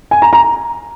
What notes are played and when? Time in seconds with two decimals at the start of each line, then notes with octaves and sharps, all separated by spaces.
0.11 G#5
0.22 A#5
0.33 A#5